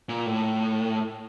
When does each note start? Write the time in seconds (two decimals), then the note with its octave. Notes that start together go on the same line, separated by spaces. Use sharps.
0.09 A#2
0.26 A2